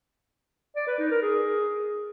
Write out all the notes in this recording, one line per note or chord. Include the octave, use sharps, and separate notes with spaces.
D5
B4
D#4
A#4
G#4